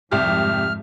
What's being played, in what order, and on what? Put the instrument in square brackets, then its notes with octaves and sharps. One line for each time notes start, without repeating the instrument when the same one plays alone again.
[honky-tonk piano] C2 G4 [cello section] F2 G#2 [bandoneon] F6